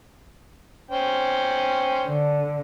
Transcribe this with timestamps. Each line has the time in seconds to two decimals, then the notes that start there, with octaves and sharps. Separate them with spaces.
0.91 C#4 C5 G5
2.06 D3